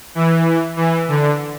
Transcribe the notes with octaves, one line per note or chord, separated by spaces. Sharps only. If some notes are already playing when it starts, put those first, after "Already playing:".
E3
E3
D3